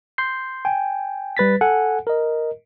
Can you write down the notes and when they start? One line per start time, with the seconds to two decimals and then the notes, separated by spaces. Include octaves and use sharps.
0.18 C6 G6 C7
0.65 G5 G#5
1.37 G3 B4 A6 B6
1.61 A4 F#5 G#5
2.07 A#4 D#5